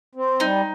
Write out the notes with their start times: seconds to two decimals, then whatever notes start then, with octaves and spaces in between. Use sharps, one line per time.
0.15 C4
0.40 G3 D#4